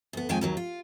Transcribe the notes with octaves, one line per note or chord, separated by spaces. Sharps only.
D2 B3
F2 D#3 F3 G#3 G5 G#5
D#2 D#3 F#3
F4